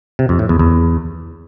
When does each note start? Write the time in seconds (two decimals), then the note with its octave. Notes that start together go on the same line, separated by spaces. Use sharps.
0.19 C3
0.29 F2
0.39 A2
0.49 E2
0.59 E2